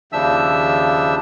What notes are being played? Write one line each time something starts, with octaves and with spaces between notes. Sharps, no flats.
D#2 C#3 F3 D4 E5 E6